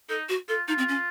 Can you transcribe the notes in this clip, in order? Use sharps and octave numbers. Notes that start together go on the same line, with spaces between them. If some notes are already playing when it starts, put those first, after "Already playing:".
D#4 A4
F#4
F4 A4
D#4 F4
C4
C#4